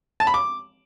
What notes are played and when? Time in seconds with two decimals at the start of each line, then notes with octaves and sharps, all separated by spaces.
0.20 A5
0.27 B5
0.34 D6